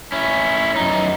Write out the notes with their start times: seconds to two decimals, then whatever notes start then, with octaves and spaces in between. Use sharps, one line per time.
0.12 C#4 E4
0.76 F#2 D#4